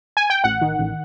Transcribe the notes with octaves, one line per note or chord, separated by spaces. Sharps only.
G#5
G5
A1 F#5
D#3
A1